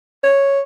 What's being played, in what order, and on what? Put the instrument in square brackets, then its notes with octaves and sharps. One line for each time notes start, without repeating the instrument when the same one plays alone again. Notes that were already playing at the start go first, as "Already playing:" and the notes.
[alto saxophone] C#5